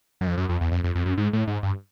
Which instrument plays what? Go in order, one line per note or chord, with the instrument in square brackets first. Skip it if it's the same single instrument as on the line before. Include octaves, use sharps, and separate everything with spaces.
[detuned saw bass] F#2
F2
F#2
F2
E2
F2
F2
F2
F#2
G#2
A2
G#2
G2